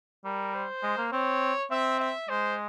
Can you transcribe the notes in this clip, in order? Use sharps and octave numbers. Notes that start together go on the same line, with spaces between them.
G3 A#4
C5
G#3
A#3
C4 C#5
C4 E5
E5
G#3 C5